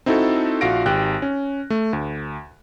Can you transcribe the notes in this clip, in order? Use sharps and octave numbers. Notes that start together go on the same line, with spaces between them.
C4 D#4 E4 F#4 A4
A#1 F4 F#4 F5 A#6 D7
G#1 G4 G5 F#6
C#4
A3
D2